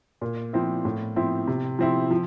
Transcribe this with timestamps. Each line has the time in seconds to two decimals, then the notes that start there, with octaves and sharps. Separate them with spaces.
0.21 A#2
0.53 F3 C4 E4
0.85 A2
1.16 F3 C4 E4
1.47 C3
1.79 F3 C4 E4
2.11 F3